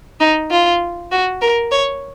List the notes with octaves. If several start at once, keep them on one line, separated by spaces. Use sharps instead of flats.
D#4
F4
F#4
A#4
C#5